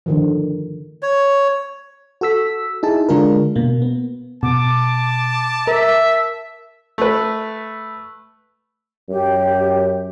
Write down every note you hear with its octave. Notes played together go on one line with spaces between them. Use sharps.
D3 D#3 F3
C#5
F#4 A4 E6 B6
D#4 E4 G#4 A5
D3 G#3 D4 F4 A#4
B2 A#3
B3
B2 A5 D6
A#4 E5
A3 B4
F#2 G4